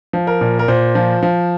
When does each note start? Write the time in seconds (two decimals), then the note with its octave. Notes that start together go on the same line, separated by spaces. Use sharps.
0.13 F3
0.27 A#4
0.41 A#2
0.59 A#4
0.68 A#2 C5
0.95 F3
1.23 F3